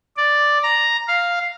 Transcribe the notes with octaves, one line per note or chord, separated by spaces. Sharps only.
D5
A#5
F5